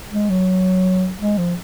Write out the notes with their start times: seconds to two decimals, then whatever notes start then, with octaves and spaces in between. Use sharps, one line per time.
0.11 G#3
0.30 F#3
1.20 G#3
1.38 F3